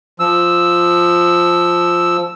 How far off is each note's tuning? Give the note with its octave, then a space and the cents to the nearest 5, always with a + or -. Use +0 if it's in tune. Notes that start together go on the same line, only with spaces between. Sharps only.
F3 +0 E6 +0